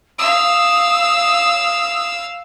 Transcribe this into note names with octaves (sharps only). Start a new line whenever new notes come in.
F5 D#6 E6